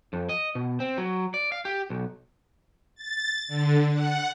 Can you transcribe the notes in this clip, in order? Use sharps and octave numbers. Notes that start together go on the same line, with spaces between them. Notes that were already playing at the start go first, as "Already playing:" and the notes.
F2
D#5
B2
C4
F#3
D5
F5
G4
B1
A6
D3
F#5